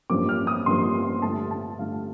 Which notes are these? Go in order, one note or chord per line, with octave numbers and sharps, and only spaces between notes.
A1 G2 F3 A#3 D6
F6
D#6
A1 G2 F3 A#3 C6
G2 D3 A3 A5
A5
G2 D3 A3 F5